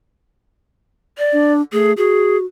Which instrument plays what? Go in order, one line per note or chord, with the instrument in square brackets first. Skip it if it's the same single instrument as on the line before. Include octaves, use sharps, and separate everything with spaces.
[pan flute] D5
[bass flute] D4
[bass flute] A3 [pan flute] G#4
[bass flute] F#4 [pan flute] G#4